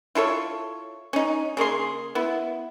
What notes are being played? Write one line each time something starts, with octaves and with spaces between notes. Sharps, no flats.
E4 F4 A4 C#5
C#4 D#4
C#3 A#3 G#4 C6
B3 E4